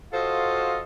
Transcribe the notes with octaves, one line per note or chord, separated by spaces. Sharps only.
F4 F#4 A4 C5 D#5 F5